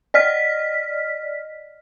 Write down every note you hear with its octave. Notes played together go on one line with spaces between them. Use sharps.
D5 D#5 F6 B6